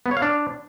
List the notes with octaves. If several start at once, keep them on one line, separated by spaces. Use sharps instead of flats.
B3
C#5
F5
D4